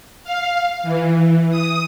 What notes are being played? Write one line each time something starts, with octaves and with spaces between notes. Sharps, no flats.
F5
E3
D#6